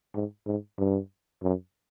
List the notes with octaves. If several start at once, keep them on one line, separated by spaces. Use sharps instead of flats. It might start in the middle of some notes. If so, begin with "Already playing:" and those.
G#2
G#2
G2
F#2